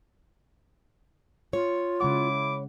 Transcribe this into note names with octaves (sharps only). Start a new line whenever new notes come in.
F4 C#5
C#3 G#3 E4 F#5 B5 D6